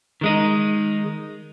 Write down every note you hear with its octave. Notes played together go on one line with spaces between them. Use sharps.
D#3 G#3 D#4